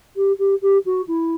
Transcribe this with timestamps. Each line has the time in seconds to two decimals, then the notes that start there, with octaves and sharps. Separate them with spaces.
0.16 G4
0.39 G4
0.62 G4
0.86 F#4
1.08 E4